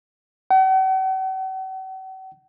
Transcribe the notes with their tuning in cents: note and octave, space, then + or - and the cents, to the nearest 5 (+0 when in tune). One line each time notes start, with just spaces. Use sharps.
F#5 +45